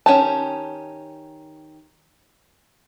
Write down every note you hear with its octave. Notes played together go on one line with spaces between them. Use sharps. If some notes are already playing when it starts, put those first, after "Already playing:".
D#3 C#4 G4 A5